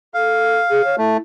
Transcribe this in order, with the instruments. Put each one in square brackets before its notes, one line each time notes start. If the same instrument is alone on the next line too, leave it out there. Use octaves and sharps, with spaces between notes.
[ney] A4 [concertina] F5
[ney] G#4
C#5
[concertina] A3 [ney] E4